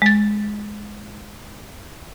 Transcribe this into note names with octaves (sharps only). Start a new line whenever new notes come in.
G#3 A6